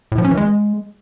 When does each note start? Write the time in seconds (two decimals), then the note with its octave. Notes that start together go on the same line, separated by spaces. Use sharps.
0.12 A2
0.18 F3
0.25 C#4
0.31 E3
0.37 G#3